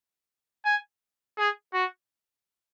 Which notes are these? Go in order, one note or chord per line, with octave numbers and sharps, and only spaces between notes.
G#5
G#4
F#4